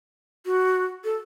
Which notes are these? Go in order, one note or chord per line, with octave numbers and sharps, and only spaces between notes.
F#4
A4